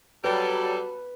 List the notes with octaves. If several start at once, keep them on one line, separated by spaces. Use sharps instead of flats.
F#3 G3 F#4 A4 B4 A5